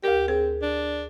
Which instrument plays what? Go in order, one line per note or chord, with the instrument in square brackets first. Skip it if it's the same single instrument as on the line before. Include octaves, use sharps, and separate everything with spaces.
[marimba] D2 A#4 [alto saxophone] G4
[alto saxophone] C4 [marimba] G#4
[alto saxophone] D4